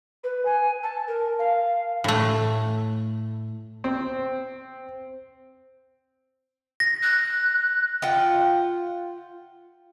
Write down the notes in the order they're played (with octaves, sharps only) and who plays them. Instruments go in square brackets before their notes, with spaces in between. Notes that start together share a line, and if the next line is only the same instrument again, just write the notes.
[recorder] B4
G#5
A5
A#4
F5
[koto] A2 A3
[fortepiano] C4
[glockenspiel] A#6
[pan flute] F#6
[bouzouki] F4 F#5 G5